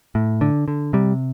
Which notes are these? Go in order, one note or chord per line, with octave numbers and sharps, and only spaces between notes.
A2
D3
D3
C3 G3